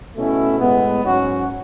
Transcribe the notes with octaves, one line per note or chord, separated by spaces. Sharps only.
B2 A3 C#4 E4
A2 G#3 B3
G#2 F#3 C#4 F#4